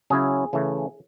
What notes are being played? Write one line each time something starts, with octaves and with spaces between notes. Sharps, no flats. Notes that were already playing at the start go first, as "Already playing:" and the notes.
C#3 F#3 C#4 E4 G#4
C#3 E3 A3